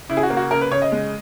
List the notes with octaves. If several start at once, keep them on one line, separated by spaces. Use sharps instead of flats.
C#3 E4
G#4
F#4
A#3
F#4
C#3 A#4
B4
C#3 C#5
D#5
G#3